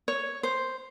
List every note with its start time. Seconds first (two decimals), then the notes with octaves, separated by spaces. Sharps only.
0.08 C#5
0.43 C5